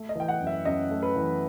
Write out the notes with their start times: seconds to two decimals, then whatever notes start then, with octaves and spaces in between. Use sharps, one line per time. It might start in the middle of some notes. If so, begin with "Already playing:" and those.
Already playing: A3
0.09 D#5
0.15 E3 G5
0.28 F#5
0.41 F#2
0.47 E5
0.65 F#2 D#5
0.91 A3
1.03 B4
1.16 E3